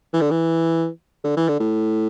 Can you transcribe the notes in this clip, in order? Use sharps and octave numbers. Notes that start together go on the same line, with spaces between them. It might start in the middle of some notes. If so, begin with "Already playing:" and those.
E3
D3
E3
D3
E3
D3
A2